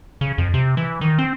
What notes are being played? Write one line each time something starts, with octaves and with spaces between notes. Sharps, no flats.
C#3
F2
C3
E3
D#3
C4